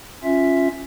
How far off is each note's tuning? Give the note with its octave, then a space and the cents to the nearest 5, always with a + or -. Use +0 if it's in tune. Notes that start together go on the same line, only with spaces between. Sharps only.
C#4 +0 F4 +0 E5 +0